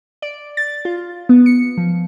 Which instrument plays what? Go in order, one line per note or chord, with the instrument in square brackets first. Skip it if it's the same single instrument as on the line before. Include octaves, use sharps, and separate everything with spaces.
[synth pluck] D5
A6
F4
B3
C#7
F3